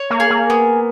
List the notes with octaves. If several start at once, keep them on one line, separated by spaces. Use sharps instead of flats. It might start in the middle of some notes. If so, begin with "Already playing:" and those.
Already playing: C#5
A#3
G#4
A#3
B3